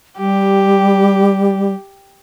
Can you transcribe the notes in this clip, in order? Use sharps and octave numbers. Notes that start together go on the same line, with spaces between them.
G3 G4